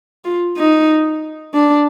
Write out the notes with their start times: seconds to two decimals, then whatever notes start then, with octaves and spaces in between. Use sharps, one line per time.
0.24 F4
0.57 D#4
1.54 D4